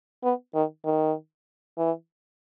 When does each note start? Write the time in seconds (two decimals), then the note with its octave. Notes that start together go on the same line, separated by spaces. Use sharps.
0.23 B3
0.54 D#3
0.85 D#3
1.78 E3